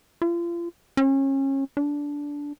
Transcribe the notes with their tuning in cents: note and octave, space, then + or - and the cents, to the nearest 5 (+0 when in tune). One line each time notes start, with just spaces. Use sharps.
F4 -35
C#4 -30
D4 -15